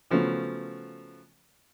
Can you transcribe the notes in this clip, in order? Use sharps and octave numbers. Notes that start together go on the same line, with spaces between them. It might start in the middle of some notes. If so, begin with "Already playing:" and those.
C#3 F3 F#3 A3 B3